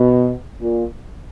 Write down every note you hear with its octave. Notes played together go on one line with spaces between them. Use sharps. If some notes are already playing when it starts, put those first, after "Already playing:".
Already playing: B2
A#2